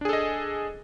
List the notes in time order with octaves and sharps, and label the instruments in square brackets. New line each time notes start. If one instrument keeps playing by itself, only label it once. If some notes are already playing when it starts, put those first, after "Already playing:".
[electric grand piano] D4
G#4
A4
D#5